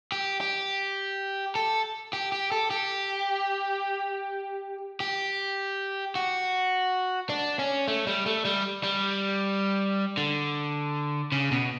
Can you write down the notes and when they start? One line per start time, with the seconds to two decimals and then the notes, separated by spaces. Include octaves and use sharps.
0.12 G4
0.41 G4
1.55 A4
2.13 G4
2.32 G4
2.52 A4
2.71 G4
5.00 G4
6.15 F#4
7.29 D4
7.59 C#4
7.88 A3
8.07 G3
8.26 A3
8.45 G3
8.83 G3
10.17 D3
11.32 C#3
11.51 B2